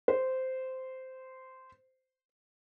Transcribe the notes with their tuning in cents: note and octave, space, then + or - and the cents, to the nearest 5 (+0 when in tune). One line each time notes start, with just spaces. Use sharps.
C5 -10